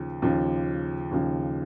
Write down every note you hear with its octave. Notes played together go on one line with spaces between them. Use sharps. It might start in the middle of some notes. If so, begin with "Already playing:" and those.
Already playing: D#2 C#3 F3
D#2 C#3 F3
D#2 C#3 F3